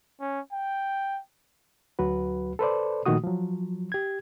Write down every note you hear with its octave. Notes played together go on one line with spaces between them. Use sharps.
C#4
G5
D2 F#3 F#4 B4
A4 B4 C5 D5
A#2 D#3 F3 A3 F#4 D#6
F3 F#3
G4 G#6